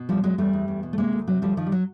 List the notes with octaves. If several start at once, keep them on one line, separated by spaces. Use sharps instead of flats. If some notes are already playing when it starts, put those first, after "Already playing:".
Already playing: B2
E2 F3 G3
E2 F#3 G#3
E2 G3 A3
E2
E2
B2
A3
C3 G#3 A#3
D2
C3 F#3
D2 F3 G3
D#3 F3
G3
F#3